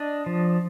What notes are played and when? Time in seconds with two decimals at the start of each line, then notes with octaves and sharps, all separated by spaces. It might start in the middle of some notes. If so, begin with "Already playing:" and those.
Already playing: D4 D#5
0.26 F3